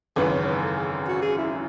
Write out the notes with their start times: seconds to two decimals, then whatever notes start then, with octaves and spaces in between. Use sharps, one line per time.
0.16 G#1 F#2 C#3 E3 B4
0.32 C#5
0.46 B4
0.62 A4
0.77 G#4
1.08 F#4
1.22 G#4
1.38 E4